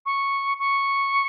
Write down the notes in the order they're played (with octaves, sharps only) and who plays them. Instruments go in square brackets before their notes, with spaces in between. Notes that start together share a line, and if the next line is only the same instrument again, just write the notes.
[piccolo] C#6
C#6